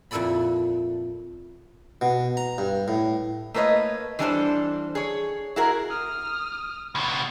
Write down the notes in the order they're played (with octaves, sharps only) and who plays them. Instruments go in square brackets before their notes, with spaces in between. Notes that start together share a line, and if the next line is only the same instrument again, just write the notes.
[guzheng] F2 A#2 E4 A4 D5 B5
[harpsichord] B2
A#5
G2
A2
[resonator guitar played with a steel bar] A3 A#3 B4 C#5 D#5
E3 G3 D4 G#4 A4 C5
G#4 C#5
E4 F#4 G#4 A#4
[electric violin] D#6 F6
[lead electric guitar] C#2 B2